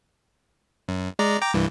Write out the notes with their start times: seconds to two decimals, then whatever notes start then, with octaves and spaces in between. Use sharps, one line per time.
0.88 F#2
1.19 G#3 D5 A#5
1.42 G5 A#5 D6
1.54 C2 G2 E3